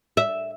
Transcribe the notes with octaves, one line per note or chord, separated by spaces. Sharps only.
E5